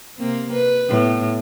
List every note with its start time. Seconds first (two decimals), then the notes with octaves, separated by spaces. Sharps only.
0.18 C3 A#3 C4
0.53 B4
0.89 A2 B3